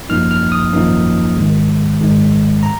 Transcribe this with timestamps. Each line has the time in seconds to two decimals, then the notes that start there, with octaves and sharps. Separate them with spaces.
0.09 G#1 F#2 F3 A#3 D#4 F6
0.31 F6
0.52 D#6
0.72 G#1 F#2 F3 A#3 D#4
1.36 G#1 G#2 D#3 G#3
2.00 G#1 G#2 D#3 G#3
2.63 A#5